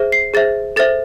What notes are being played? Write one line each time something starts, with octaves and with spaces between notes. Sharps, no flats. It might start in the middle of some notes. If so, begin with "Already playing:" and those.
Already playing: G#4 C5 E5
C7
G#4 C5 E5 A6
A4 C5 E5 A6